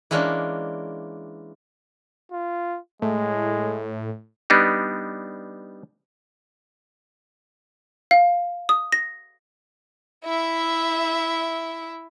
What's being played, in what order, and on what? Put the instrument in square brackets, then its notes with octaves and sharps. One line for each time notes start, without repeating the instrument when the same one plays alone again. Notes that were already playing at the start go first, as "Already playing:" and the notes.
[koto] E3 G#3 A#3 C#4 D4
[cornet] F4
[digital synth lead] A2 [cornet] G#3
[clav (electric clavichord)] G3 B3 D4 D#4
[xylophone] F5
D#6
A#6
[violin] E4 E5